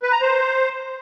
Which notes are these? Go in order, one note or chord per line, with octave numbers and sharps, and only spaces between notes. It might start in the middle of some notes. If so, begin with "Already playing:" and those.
B4
A#5
C5